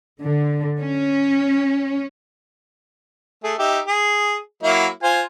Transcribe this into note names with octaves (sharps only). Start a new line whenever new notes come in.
D3
C#4
A3 G#4
D#4 G4 E5
G#4
F#3 A#3 E4
F4 C5 G#5